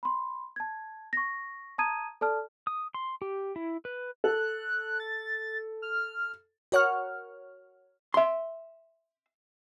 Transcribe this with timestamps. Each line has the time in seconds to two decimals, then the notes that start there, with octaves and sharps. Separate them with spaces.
0.03 B5 C6
0.56 A5 G#6
1.13 C#6 A#6
1.78 A5 A#5 D#6 G#6 D#7
2.21 A4 D5 A5 F6
2.67 D#6
2.94 C6
3.22 G4
3.56 E4
3.85 B4
4.24 A4 F#6
5.00 A6
5.82 F6
6.72 F#4 A#4 C#5 F#5 C#6 F6
8.14 E5 C6